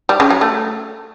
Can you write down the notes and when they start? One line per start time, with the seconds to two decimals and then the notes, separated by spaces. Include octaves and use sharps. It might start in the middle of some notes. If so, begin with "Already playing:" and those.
0.09 G3
0.20 C#3
0.31 F#3
0.41 A3